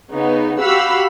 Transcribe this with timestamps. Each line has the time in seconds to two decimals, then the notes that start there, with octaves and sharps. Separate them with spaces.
0.12 C#3 B3 D#4
0.61 F#4 G4 F5 F#5 B5 E6